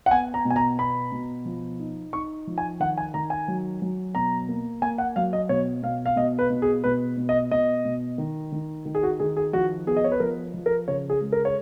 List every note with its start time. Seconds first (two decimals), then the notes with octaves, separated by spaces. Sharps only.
0.06 F#5
0.11 B3 G#5
0.34 A#5
0.45 B2
0.50 G#5
0.56 A#5
0.78 B3 B5
1.12 B2
1.45 F3
1.79 D#4
2.13 D#4 C#6
2.47 F3
2.58 G#5
2.80 D#3 F#5
2.98 G#5
3.14 D#3 A#5
3.30 G#5
3.48 F#3
3.82 F#3
4.15 B2 A#5
4.49 A#3
4.82 A#3 G#5
4.98 F#5
5.16 F#3 F5
5.33 D#5
5.49 B2 C#5
5.83 B2 F5
6.06 F5
6.16 B2 D#5
6.39 B4
6.50 B2
6.62 G#4
6.84 B2 B4
7.17 B2
7.29 D#5
7.51 B2 D#5
7.85 B2
8.18 D#3
8.52 D#3
8.85 D#3
8.95 G#4
9.03 F#4
9.20 D#3 G#4
9.37 G#4
9.53 F3 F#4
9.87 B3 G#4
9.97 D#5
10.04 C#5
10.12 B4
10.20 F3 A#4
10.54 F3
10.66 A#4
10.88 C#3 C#5
11.10 G#4
11.21 G#3
11.32 A#4
11.45 C#5